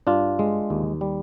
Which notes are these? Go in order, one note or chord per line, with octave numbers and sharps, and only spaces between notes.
G2 D4 F4
G#3
D#2
G3